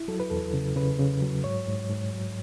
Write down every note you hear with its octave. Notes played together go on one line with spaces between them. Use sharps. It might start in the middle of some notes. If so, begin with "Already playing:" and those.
Already playing: E4
F#3 A4
B4
E2 A4
C#3
C#3 B4
C#3
F#3
G#2 C#5
G#2
G#2
F#3